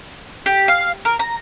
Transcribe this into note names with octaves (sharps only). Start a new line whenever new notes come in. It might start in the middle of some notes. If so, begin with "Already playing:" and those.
G4
F5
A#4
A#5